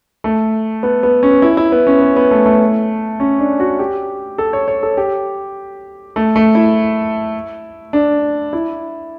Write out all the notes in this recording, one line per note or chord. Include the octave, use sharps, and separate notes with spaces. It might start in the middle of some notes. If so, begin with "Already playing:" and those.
A3
B3
B3
C#4
E4
E4
B3
C#4
B3
B3
A3
A3
C#4
D4
F#4
G4
A4
C#5
C#5
A4
G4
A3
A3
E4
D4
E4